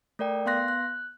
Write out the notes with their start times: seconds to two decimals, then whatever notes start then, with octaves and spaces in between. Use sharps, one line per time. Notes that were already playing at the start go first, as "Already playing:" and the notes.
0.19 A3 A#4 D5 G5
0.46 B3 F5 C6 F#6 A#6
0.68 F#6